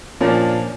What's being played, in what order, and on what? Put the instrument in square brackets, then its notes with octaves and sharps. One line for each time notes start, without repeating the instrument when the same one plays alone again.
[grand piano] A#2 F3 A#3 D4 [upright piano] C#4